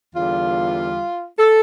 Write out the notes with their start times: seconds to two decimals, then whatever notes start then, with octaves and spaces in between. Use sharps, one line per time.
0.14 E2 D3 G3 F4
1.39 A4